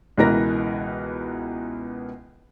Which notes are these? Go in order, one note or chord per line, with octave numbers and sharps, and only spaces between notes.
C#2 B2 E3 A#4 B4 A#6